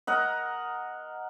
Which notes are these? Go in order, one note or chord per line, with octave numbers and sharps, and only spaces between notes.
A#4 D#5 F#5